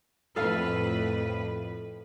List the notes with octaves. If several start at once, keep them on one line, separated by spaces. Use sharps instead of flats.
F2 A2 A4 B4 F5